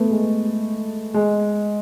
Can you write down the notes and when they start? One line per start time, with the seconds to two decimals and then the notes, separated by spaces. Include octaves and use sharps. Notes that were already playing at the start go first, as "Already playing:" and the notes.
Already playing: A3 B3
0.11 G#3
1.14 G#3